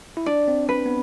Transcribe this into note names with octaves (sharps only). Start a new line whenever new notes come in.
E4
D4 D5
C4
B4
B3